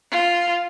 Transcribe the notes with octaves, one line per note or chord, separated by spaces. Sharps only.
F4